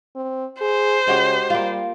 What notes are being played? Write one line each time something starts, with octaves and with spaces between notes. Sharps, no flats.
C4
G#4 C5
C#3 G#3 F#4 G4
G3 A#3 F4